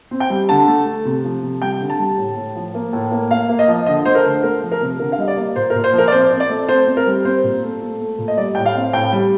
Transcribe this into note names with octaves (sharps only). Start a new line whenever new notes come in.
C4
G5
G3
D3 A5
A3
A3
C3
F3
C3
G3 G5
D3
A5
G3
A2
A2
F3
A#3
A2
A#3
A#3 F5
A#3
D#5
F3
D3 D#5
A3 C5
A#4
D3 C5
A3 A#4
F3
A#4
C3
D3 A#4
F5
G3 D#5
D5
A#3
A#2 C5
A#4
A#2
C5
F3 A#4
D5
C4 C5
C4
D5
A3
C4 C5
C4
A#4
G3
C4 C5
A#2
A3
A3
A3
A#2
D#5
G3 D5
A2 G5
F5
C4
A2 G5
G3